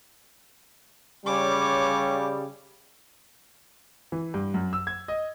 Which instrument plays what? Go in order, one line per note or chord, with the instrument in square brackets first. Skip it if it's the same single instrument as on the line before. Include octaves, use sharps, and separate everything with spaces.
[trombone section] C#3 G3 [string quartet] C#5 D6
[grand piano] E3
G2
F#2
E6
G#6
D#5